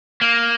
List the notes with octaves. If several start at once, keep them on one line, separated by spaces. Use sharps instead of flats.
A#3